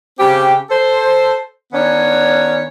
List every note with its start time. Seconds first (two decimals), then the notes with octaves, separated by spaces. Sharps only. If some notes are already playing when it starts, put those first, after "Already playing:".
0.19 C#3 C4 G4
0.70 A4 C5
1.73 D#3 B3 C#4 D4 C#5